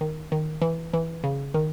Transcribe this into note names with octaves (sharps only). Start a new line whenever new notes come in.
D#3
D#3
E3
E3
C#3
D#3